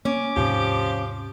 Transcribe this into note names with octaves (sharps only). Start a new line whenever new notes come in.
A#3 C#4 D6
D#2 G#2 C3 F3 G4